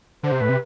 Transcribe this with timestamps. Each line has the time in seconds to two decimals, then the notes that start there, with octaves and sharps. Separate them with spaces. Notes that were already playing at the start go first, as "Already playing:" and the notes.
0.23 D3 C5
0.32 C3
0.41 A2 B4
0.49 C3